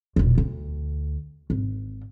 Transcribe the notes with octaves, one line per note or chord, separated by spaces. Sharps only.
E1 A#1
D2
G#1